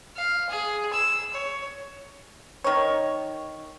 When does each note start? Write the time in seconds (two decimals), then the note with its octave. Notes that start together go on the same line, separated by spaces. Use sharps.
0.16 F5
0.49 G#4
0.93 E6
1.33 C#5
2.64 D#3 C#5